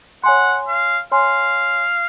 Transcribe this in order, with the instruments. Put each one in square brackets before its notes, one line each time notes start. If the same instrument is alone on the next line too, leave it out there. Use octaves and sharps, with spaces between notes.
[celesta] C#5 G#5 C6 [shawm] F#5
[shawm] F5
[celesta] C#5 G#5 C6 [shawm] F5